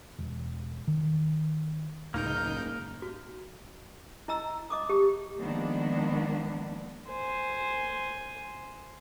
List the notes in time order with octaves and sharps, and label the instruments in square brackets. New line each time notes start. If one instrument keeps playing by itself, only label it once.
[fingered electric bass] E1
D#3
[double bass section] F#1 [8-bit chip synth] C#2 D#4 G6 [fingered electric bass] A2 [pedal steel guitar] A#3 A#4
[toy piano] F#4
E4 D#5 A#5 E6
D#5 D6 D#6
G4
[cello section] D#3 F3 G#3 A#3 B3 D4
[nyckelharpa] C5 G#5